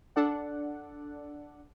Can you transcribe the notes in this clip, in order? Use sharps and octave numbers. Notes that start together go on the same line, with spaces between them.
D4 A4 D5 F#5